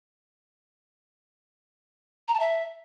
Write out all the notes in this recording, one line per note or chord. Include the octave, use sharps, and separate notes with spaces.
A#5
A5
E5